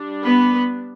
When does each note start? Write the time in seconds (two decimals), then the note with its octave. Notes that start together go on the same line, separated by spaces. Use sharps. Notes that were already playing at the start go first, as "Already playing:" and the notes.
Already playing: G3 D4
0.25 B3 B4